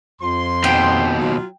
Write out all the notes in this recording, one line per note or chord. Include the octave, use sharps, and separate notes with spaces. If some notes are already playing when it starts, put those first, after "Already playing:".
F2 F3 C6
D#2 B2 G5
F#3 F4